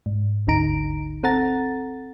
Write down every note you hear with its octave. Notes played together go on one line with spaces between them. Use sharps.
G#2
G1 D2 D3 D#4 A#5 D7
C4 A4 F#5 A#5 A6